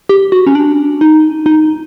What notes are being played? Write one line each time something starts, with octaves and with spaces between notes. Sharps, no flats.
G4
F#4
C#4
D4
D#4
D#4